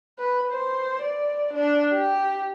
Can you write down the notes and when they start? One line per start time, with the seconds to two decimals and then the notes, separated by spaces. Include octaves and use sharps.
0.19 B4
0.52 C5
1.02 D5
1.54 D4
1.94 G4